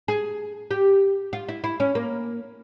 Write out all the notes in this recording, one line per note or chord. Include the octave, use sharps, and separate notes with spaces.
G#4
G4
F4
E4
E4
C#4
A#3